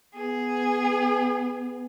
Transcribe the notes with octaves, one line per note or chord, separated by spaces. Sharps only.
B3 G#4